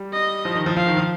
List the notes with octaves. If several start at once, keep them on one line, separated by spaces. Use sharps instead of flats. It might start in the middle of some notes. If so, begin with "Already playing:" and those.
Already playing: G3
D#5
F3
D#3
F3
F3 F5
D#3
F3